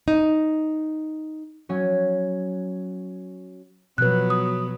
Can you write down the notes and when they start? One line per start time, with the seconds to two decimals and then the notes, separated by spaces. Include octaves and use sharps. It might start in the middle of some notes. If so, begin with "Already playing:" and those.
0.08 D#4
1.69 F#3 C#4
3.98 B2 F3 F#3 B3 B4 F#6
4.30 D#6